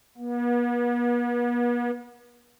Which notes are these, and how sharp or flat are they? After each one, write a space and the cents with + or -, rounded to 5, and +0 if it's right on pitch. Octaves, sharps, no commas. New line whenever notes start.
B3 -45